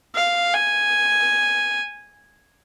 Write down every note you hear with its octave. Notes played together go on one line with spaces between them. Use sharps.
F5
G#5